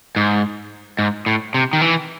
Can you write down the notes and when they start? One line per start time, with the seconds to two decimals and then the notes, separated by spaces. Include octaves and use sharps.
0.16 G#2
0.99 G#2
1.26 A2
1.54 C3
1.73 D#3
1.81 E3